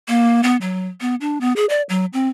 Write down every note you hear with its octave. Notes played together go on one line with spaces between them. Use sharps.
A#3
B3
F#3
B3
D4
B3
G#4
D5
F#3
C4